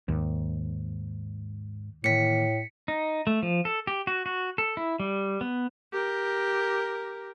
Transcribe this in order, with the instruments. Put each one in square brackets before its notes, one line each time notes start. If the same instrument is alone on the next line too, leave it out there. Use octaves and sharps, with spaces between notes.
[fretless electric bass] D#2 [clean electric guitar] G#2
[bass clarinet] A2 [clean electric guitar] D#3 E3 A#3 [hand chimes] B6 C#7
[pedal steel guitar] D#4
A3
F3
A4
G4
F#4
F#4
A4
E4
G3
B3
[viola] G4 A#4